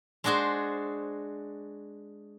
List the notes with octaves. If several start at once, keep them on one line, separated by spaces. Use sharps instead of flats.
G#3 D4 F#4 G#4 C5